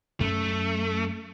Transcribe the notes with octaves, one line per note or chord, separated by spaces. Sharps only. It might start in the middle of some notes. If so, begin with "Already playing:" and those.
F#2 A3 C#4